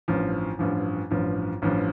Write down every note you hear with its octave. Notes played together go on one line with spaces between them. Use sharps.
A1 G2 F3
A1 G2 F3
A1 G2 F3
A1 G2 F3